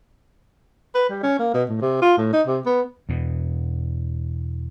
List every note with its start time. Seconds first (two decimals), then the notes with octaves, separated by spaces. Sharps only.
0.95 B4
1.09 G3
1.23 C#4
1.39 A#3
1.54 B2
1.69 A2
1.82 C3
2.02 F4
2.18 A2
2.33 D#4
2.47 C3
2.66 B3
3.09 E2 B2